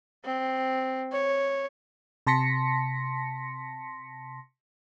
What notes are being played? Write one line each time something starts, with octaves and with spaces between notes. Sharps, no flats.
C4
C#5
C3 A5 C6 A#6 B6 C#7